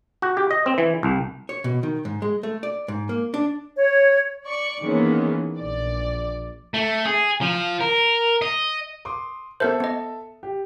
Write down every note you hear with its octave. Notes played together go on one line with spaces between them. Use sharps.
F#4
G4
D#5
C4
E3
C2
C#5
B2
D#3
G#2
G#3
A3
D5
G#2
A#3
D4
C#5
D5 C#6
D#3 E3 G#3 A#3 B3 C#4
A#1 D5
A3
G#4
F3
A#4
D#5
C6 D6 D#6
B3 A4 A#4 C5 E5 A5
B3 D#5
G4